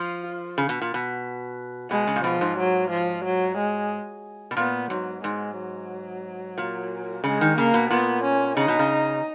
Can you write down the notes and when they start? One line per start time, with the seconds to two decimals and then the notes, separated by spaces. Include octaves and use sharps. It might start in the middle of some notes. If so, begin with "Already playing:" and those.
Already playing: F3 F4
0.58 C#3
0.69 B2
0.81 A#2
0.94 B2
1.90 B2 G#3
2.07 C#3
2.16 A#2
2.24 B2 F3
2.41 G#2
2.58 F#3
2.90 F3
3.25 F#3
3.57 G#3
4.51 B2
4.57 A#2 B3
4.90 G#2 F#3
5.23 G#2 G#3
5.57 F#3
6.58 A#2
7.24 C#3 G#3
7.41 D#3
7.57 C#3 A#3
7.74 B2
7.90 A#2 B3
8.24 C#4
8.57 C#3 D#4
8.68 B2
8.79 C#3